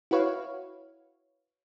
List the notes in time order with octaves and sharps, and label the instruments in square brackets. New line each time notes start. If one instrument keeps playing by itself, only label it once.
[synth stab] E4 F#4 B4 C#5 F5